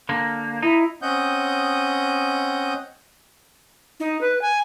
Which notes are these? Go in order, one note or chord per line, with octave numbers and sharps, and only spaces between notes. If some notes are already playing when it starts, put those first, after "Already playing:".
D3 A#3
D#4 E4
C4 C#4 D#5 F#5 D#6 G6
D#4
B4
G#5